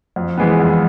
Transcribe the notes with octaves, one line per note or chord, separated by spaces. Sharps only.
F2
E3 G#3 B3
F2